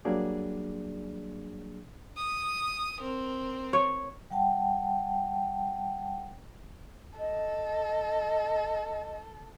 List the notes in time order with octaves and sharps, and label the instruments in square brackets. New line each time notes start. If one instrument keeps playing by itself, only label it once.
[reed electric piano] F#3 G3 A#3 D4 G#4 D5
[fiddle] D#6
C4 A#4
[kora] C#5
[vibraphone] G3 F#5 G5 A5
[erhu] A4 [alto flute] D#5